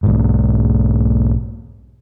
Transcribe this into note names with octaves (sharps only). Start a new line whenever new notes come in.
B1 G#2